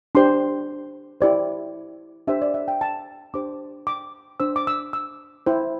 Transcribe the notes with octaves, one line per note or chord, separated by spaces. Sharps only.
D4 G4 C5 C6
E4 G4 C5 D5
D4 G4 C5 E5
D5
E5
G5
A5
D4 G4 C5 D6
D6
D4 C5 E6
D6
E6
E6
E4 C5